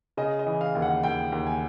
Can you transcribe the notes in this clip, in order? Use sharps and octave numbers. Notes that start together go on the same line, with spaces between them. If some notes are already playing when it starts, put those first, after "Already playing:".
C#3 D#5
D#5
E3
F5
D#2
F#5
D#2 G5
D#2
G#5